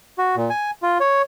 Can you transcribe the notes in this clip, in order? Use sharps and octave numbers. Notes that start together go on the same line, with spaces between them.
F#4
A#2
G#5
F4
C#5